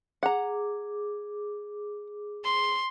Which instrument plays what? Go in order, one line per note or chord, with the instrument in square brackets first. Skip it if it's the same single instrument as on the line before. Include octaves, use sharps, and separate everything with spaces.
[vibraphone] G#4 D6 [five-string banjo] F#5 A#5
[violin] C6